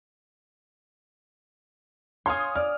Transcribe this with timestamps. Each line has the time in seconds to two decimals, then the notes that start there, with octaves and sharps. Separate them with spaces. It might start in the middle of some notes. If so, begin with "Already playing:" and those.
2.26 C#5 F5 G#5 C6 D#6
2.56 D5 F6